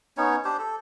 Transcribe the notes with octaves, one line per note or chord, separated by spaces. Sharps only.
B3 C#4 D#4 C#5
D4 G4 C5
A4